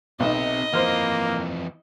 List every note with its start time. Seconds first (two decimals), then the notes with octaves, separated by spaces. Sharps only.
0.20 B1 C3 D#4 D#5 E5
0.73 F2 E3 A#3 C5 F6